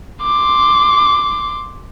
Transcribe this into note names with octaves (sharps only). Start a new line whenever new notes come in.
C6 D6